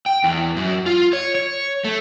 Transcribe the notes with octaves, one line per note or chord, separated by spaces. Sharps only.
G5
E2
F#2
F4
C#5
C#5
A3